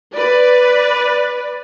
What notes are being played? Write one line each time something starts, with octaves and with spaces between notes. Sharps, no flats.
B4 D5